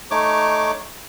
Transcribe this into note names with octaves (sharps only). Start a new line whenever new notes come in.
A3 D#4 C#5 D6